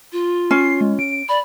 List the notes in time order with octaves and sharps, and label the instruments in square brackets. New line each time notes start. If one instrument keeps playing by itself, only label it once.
[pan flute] F4
[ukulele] C#4 [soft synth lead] C7
[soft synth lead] G#3
D7
[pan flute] D5 [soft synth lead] B5